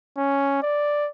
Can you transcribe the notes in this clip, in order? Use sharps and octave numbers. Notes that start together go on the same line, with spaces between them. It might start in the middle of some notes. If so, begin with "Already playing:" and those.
C#4
D5